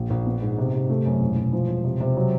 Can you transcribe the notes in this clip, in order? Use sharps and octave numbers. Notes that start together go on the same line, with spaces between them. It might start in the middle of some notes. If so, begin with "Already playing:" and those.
Already playing: A#1
A#1
B3
G#2
C3
C3
A3
F#2
E1
E1
F3
E1
C3
C3
F#3